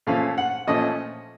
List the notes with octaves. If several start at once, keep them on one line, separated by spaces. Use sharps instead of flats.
A#2 F3 A3 C#4 F5
F#5
A#2 F3 A3 C#4 D#5